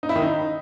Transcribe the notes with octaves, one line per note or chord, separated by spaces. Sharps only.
D#4
E4
D#3
D#4